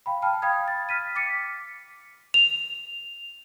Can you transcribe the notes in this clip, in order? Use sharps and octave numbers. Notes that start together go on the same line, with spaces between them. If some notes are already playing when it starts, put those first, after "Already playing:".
F5 G5 B5
G5 A5 B5 F6
F5 G5 B5 D#6 G#6
A6
F6 B6 D#7
D6 A6 B6 C#7
F7